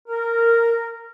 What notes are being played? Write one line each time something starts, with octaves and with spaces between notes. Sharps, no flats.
A#4